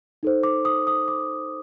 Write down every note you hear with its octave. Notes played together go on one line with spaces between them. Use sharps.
D#4 A4 C5
D6
D#6
D#6
D6